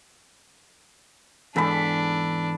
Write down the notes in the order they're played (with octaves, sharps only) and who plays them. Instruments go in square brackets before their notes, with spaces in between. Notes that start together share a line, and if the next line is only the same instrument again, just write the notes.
[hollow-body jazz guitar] E2 G#2 [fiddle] D4 [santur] A4 B5